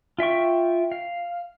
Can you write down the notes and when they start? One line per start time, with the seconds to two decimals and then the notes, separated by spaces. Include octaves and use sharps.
0.18 F4 E5 G5 C#6
0.92 F5